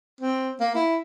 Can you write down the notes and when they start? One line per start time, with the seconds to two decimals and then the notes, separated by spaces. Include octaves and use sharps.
0.21 C4
0.60 A#3
0.75 E4